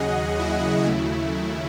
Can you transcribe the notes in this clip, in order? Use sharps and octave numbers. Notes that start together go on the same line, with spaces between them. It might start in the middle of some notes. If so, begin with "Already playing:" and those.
Already playing: D#2 C#3 F#3 G#4 D#5 F#5
E4
D#2 C#3 F#3 A3